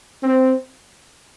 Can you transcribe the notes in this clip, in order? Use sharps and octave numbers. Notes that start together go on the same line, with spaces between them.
C4